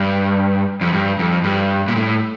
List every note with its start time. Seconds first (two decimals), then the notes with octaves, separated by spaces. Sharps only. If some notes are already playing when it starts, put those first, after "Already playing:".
Already playing: G2
0.81 F2
0.93 G2
1.19 F2
1.44 G2
1.88 A#2
1.96 A2